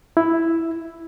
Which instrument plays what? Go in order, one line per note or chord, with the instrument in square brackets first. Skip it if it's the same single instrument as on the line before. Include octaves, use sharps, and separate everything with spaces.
[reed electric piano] E4